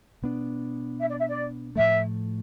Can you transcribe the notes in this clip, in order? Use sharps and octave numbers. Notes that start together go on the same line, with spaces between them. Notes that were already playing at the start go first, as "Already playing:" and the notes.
B2 B3 D4
E5
D5
E5
D5
A2 F3 A3 E5